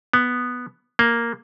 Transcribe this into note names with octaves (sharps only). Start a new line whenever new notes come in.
B3
A#3